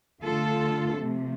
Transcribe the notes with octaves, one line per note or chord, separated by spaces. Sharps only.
D3 A3 F4 A4
C3 F3 A3